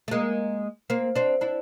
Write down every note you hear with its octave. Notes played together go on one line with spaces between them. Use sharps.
A3
G#3 A#3
A#3 C4
C4 D4
D4 E4